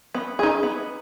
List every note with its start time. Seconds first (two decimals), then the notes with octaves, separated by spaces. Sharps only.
0.14 B3
0.39 D#4 G#4
0.63 B3